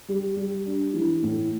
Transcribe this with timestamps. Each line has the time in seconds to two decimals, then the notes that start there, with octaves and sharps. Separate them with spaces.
0.08 G3
0.36 G3
0.66 D4
0.94 E3
1.23 A2